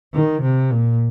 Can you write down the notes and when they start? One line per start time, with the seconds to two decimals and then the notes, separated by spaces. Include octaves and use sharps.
0.14 D#3
0.42 C3
0.71 A#2